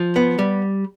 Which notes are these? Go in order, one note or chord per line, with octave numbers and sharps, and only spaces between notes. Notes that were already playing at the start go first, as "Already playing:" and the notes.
Already playing: F3
B3
G3